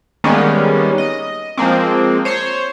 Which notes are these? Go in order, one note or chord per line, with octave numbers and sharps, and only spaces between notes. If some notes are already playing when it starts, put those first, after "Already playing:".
D#3 G3 G#3 A#3 B3 C#4
D#5
F3 G#3 A#3 C4
C5 C#5